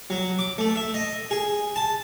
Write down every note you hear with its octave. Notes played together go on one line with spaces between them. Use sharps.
F#3
D6
A3
E5
D#5
G#4
A5